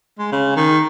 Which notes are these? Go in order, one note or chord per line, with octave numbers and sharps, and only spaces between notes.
G#3
C#3
D#3